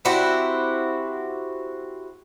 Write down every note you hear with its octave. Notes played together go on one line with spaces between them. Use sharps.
C4 E4 F#4 G4